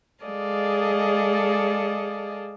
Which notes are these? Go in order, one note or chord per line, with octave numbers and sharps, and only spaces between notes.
G#3 G#4 A4 D5 D#5 F5